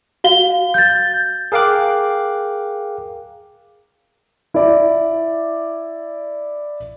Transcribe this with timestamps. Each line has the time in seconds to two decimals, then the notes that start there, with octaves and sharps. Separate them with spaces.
0.24 F#4 F5 G7
0.74 G6 A6
1.52 G#4 A#4 F5 G5 D6 F#6
4.54 E4 D5